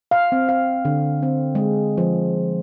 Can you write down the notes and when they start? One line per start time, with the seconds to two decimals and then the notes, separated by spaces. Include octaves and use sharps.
0.11 F5
0.32 C4
0.49 F5
0.85 D3
1.22 C4
1.55 G#3
1.98 F3